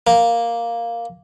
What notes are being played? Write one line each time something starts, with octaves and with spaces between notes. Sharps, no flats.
A#3